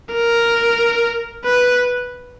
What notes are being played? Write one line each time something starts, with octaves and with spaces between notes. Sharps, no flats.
A#4
B4